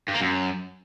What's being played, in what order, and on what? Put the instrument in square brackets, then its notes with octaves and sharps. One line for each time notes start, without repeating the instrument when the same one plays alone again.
[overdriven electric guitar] G2
A#3
F#2